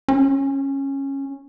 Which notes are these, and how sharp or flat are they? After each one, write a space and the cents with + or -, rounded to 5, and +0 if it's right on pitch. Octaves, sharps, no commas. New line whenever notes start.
C#4 -15